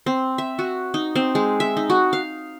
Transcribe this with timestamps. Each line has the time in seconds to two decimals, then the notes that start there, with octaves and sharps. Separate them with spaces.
0.06 C4
0.38 E5
0.59 F#4
0.94 D#4
1.15 C4
1.35 G#3
1.60 E5
1.77 D#4
1.90 F#4
2.13 F5